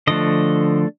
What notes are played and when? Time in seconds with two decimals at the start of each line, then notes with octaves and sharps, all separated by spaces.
0.07 D3 F3 A3 D4 D#5